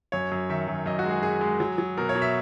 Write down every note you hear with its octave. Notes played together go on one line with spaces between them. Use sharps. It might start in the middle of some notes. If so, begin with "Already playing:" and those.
F#2 C#5
F#2
D#3 E5
F#2
F#2 D#5
F#4
G#3
G#4
F#2 G#4
G#3
F#3
F#3
B2 A#4
C#5
B2
E5